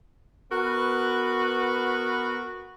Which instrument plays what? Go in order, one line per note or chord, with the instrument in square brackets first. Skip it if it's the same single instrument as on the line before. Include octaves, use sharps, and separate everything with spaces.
[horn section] B3 F#4 A#4 B4